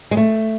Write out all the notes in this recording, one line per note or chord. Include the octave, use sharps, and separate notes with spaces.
G#3
A3